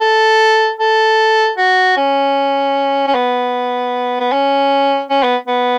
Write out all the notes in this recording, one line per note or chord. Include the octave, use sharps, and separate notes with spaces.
A4
A4
F#4
C#4
C#4
B3
B3
C#4
C#4
B3
B3